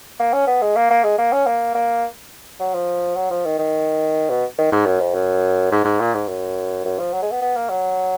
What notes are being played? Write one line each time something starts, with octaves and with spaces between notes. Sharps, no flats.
A#3
C#4
B3
G#3
A#3
A#3
G#3
A#3
C#4
A#3
A#3
F#3
F3
F#3
F3
D#3
D#3
B2
D#3
G#2
F#2
F2
F#2
G#2
G#2
A#2
G#2
F#2
F#2
F3
F#3
G#3
B3
B3
A#3
F#3